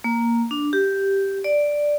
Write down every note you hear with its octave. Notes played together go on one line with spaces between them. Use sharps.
A#3
D4
G4
D5